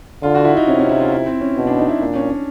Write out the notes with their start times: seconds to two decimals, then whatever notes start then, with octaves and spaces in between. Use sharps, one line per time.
0.23 D3 F4
0.35 F#4
0.45 E4
0.57 D#4
0.67 C3 C#4
0.79 C#4
0.89 E4
1.00 F4
1.12 E4
1.26 C4
1.41 C#4
1.57 B2
1.67 D4
1.79 D#4
1.89 E4
2.00 A#2 D4
2.15 C#4
2.30 C#4